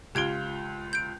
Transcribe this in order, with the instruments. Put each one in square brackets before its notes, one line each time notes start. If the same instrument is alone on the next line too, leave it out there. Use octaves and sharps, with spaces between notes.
[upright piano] C#2 F4 G7 [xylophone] G4 G#6 D7
[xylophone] G6 D7